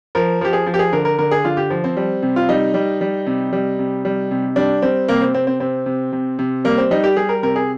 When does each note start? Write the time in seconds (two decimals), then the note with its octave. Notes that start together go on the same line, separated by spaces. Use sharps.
0.15 F3 A#4
0.41 F3 G4
0.53 G#4
0.66 F3
0.74 G4
0.79 G#4
0.93 D3 A#4
1.05 A#4
1.19 D3 A#4
1.31 G#4
1.45 D3 F4
1.57 G4
1.70 F3
1.84 C4
1.97 G3
2.23 C3
2.36 F4
2.49 G3 D#4
2.74 G3
3.01 G3
3.27 C3
3.53 G3
3.79 C3
4.05 G3
4.31 C3
4.56 G3 D4
4.82 G3 C4
5.08 C3 A#3
5.22 C4
5.34 C3 C4
5.47 C4
5.60 C3 C4
5.86 C3
6.12 C3
6.39 C3
6.64 G3 A#3
6.78 C4
6.91 G3 D#4
7.04 G4
7.16 G3 G#4
7.29 A#4
7.43 C3 A#4
7.56 G#4